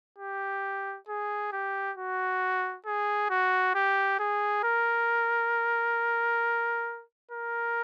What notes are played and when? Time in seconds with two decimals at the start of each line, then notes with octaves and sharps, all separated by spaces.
0.18 G4
1.08 G#4
1.52 G4
1.97 F#4
2.86 G#4
3.30 F#4
3.75 G4
4.19 G#4
4.64 A#4
7.31 A#4